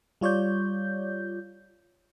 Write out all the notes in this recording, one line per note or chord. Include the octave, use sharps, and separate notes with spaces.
G3 F4 C#5 D5 G6